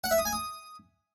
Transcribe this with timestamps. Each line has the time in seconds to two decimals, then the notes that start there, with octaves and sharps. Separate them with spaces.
0.04 F#5
0.11 E5
0.18 D#6
0.25 G#5
0.33 D#6